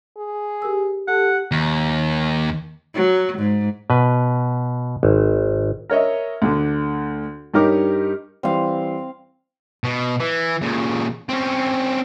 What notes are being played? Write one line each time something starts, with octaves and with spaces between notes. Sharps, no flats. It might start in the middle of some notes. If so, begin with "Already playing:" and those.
G#4
G4 A#4 E6
G4 A4 F#5
D#2
F#3
G#2
B2 B4
G#1
A#4 C#5 D#5 E5
D2 D3
G2 D#4 G4 A#4 C#5 D6
E3 G3 C4 F5
B2
E3
A#2 C#3
C4 C#4